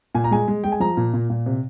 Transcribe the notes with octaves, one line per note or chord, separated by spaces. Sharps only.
A#2 G#5
A#5
G#3 G#5
G#3
G#3 G5
G#5
F3 A#5
A#2
A#2
A#2
C3